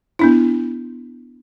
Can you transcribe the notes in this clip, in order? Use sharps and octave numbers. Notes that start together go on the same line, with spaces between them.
B3 D4 E4